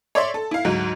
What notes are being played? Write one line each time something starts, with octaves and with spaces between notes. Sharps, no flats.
C#5 D5 E5 C6
A4
E4 F5
D2 G#2 F#3